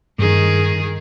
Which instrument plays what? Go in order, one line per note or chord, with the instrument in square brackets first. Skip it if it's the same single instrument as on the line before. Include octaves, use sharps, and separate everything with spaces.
[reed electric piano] G2 [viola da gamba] D#3 G#4